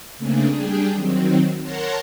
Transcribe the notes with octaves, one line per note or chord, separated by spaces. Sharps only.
C#3 A3 A#3 C4 D4 G#4
G3 D4 G4 G#4
D#3 F#3 C4
A#4 C#5 F#5 A5 A#5 C6